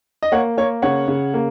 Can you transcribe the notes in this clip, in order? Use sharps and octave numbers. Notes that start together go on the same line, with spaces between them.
D#5
A#3 C#5 F#5
A#3 C#5
C#3 C#5 F#5
C#3
A#3